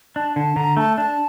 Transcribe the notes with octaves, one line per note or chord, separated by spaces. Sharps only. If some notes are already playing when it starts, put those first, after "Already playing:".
D4 A5
D3 A5
D3 A#5
A3 A5
D4 A5